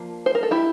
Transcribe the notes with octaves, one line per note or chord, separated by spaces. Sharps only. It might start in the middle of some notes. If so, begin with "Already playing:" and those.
Already playing: F3 A#3 D4
C5
A#4
A4
E4 G4